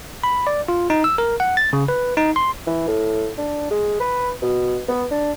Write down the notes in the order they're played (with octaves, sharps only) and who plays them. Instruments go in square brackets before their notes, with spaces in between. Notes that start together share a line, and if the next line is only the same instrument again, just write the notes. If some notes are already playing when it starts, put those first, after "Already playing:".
[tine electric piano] B5
D5
F4
D#4
E6
A#4
F#5
A6
C#3
B4
D#4
C6
[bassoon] E3
A2
D4
G#3
B4
B2
B3
D4